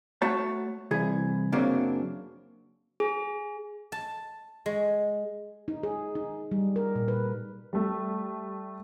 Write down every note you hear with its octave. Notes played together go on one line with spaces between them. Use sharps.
A3 F#4 C#5 A5
C2 E3 G#4
F#2 C#3 F#3 A#3 C4 D4
G#4
A5
G#3
D#4
G#4
D#4
G3
A#4
A#2
B4
G3 A3